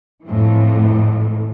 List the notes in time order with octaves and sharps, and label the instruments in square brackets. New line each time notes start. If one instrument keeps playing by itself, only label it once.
[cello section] F2 A2 E3